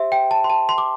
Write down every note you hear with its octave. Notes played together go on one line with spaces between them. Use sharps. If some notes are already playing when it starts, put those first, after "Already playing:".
Already playing: G4 C5 E5 C6
G5
A5
C6
A5
C6
D6